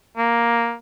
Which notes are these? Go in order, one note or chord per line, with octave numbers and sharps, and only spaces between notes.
A#3